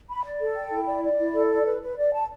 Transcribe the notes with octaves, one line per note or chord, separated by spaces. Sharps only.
B5
D5
A4
G5
E4
D5
D5
E4
A4
D5
B4
B4
D5
A5